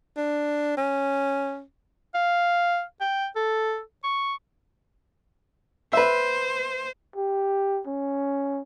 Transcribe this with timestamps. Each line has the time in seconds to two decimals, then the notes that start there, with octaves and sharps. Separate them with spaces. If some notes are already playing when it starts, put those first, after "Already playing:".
0.17 D4
0.77 C#4
2.14 F5
3.01 G5
3.36 A4
4.04 C#6
5.93 B4 C5 E5
7.16 G4
7.87 C#4